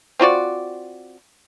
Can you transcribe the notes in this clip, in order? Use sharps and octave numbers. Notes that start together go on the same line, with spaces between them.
C4 F4 F#4 D5